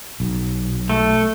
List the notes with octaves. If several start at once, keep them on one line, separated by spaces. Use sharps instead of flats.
B1
A3